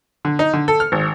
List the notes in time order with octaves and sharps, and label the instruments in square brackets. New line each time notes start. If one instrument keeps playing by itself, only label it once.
[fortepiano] D3
D#4
D3
A4
F6
G#1